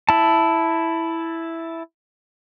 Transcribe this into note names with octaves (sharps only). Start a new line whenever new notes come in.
E4 A5